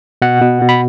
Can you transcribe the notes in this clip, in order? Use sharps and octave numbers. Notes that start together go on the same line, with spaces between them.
B2 F#5
B2
B2
B5